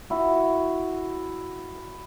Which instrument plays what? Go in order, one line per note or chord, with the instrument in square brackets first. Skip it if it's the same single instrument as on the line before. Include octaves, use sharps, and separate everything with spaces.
[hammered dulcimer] E4 F#4